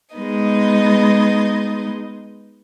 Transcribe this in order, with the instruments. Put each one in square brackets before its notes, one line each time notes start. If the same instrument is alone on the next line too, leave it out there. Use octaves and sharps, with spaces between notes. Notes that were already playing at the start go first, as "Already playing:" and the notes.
[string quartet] G#3 B3 D#4 D#5